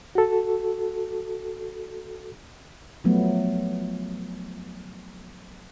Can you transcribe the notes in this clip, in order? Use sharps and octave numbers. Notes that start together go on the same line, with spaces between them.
F#4 A4
F3 F#3 A3 B3